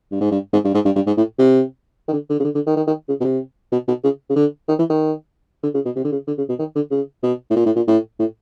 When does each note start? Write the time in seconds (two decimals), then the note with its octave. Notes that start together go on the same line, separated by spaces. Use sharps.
0.12 G2
0.21 G#2
0.32 G2
0.53 G#2
0.65 G2
0.75 G#2
0.85 G2
0.96 G2
1.07 G#2
1.17 A2
1.39 C3
2.08 D#3
2.13 D3
2.30 D3
2.40 C#3
2.45 D3
2.55 D3
2.67 D#3
2.77 D#3
2.87 D#3
3.09 C#3
3.21 B2
3.24 C3
3.72 B2
3.88 B2
4.04 C#3
4.30 C#3
4.36 D3
4.69 D#3
4.79 E3
4.90 D#3
5.63 D3
5.74 C#3
5.86 B2
5.96 C3
6.05 D3
6.12 C#3
6.27 D3
6.38 C#3
6.49 B2
6.59 D#3
6.76 D3
6.91 C#3
7.23 B2
7.51 A2
7.56 A#2
7.66 A2
7.76 A#2
7.88 A2
8.20 A2